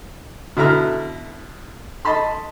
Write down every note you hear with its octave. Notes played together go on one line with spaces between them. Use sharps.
B2 D3 E4 A#5 F6
D#5 A5 B5 C6